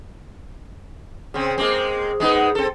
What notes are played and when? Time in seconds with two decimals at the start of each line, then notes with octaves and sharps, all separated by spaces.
1.34 C#3 C4
1.58 G#3 A#3 C4
2.20 G#3 B3 D#4
2.55 C4 A4